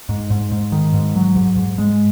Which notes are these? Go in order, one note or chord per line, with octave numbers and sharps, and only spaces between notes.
G#2
G#2
G#2
D#3
G#2
F#3
G#2
G#2
G#3